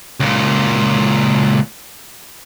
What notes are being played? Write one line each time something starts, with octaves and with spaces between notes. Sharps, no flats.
C#2 A#2